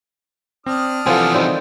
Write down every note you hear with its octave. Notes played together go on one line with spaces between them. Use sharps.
C4 D4 D#6 F6
C3 E3 F3 B3 C4 A4 G5 G#5
D#3 G3 C4